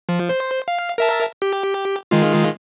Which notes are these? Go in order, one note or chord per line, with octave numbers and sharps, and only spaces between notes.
F3
C5
F5
A#4 E5 A5
G4
D#3 G#3 F4